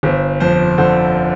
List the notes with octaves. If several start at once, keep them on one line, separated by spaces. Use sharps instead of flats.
G1 C5
F2 C5
D3 C5